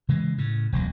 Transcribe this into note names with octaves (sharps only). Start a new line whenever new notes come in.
C#3 E3 G#3
A2 C#3
E1 C#2 F#3